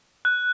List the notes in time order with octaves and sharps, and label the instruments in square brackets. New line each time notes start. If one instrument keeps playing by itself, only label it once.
[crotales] F#6